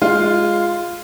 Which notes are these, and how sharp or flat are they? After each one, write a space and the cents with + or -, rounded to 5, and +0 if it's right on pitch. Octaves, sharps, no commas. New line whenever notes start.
G#3 -5 F4 +0